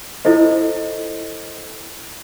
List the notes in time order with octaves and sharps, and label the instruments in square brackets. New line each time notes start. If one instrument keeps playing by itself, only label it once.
[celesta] E4 F4 A4 C5 D#5